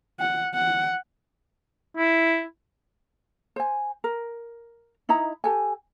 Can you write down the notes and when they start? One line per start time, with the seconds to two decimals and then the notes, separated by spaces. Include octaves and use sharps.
0.20 F#5
0.54 F#5
1.97 E4
3.56 C5 G#5
4.04 A#4
5.09 D#4 E4 D#5 A#5
5.44 G4 A4 G#5